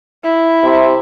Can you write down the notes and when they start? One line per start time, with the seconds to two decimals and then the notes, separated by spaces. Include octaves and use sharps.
0.24 E4
0.63 C3